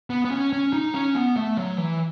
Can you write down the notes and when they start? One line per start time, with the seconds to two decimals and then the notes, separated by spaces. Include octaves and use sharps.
0.10 B3
0.25 B3
0.31 C#4
0.53 C#4
0.73 D#4
0.95 C#4
1.15 B3
1.36 A3
1.57 F#3
1.78 E3